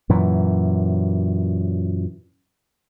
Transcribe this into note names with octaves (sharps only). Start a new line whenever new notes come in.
F#2 A#2 E3